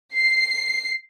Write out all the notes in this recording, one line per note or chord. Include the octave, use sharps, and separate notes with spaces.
C7